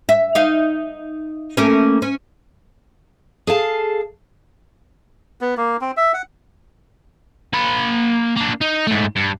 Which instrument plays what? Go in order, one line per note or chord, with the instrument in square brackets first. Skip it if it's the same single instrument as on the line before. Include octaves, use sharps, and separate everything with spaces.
[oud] E5
D#4 F5
A3 A#3 C#4
C#4
[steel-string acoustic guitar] G#4 A4 F5 A5
[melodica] B3
A#3
C4
E5
F#5
[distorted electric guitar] A#3 B5
A#3 D4
D#4
G#2 A3
G2